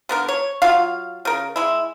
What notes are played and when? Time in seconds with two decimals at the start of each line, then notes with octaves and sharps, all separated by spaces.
0.09 D3 B3 A#4
0.28 C#5
0.62 F#3 F4 F#4 F5
1.25 C#3 A#4
1.56 G#3 E4